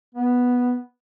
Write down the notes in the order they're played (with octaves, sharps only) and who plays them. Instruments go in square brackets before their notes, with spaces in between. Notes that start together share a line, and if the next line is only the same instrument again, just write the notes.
[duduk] B3